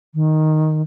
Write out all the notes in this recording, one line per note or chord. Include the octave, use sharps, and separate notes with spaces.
D#3